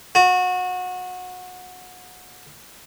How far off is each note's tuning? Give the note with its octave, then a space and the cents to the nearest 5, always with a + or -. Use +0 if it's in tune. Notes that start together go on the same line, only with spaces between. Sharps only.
F#4 -25